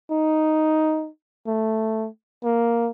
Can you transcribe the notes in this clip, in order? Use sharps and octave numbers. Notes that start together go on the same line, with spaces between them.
D#4
A3
A#3